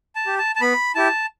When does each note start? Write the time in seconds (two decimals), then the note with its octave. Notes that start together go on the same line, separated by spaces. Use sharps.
0.16 A5
0.26 G4
0.38 A5
0.56 A5
0.61 B3 B5
0.95 E4 G4 A5